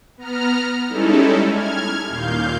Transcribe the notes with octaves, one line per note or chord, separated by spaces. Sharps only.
B3 A#5 F6
G3 G#3 C#4 D#4 E4 A4
F6 G#6
D#2 A#2 F5 G6